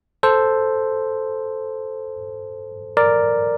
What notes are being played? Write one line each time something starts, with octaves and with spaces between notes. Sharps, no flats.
A4 C5
A#4 D5